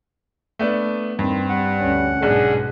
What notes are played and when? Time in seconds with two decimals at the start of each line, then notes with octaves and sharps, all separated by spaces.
0.59 A3 B3 D4
1.19 G2 D#3 C4
1.49 G3 F#5
1.80 D2 C#4
2.23 B1 G#2 B2 D4 G#4 F#6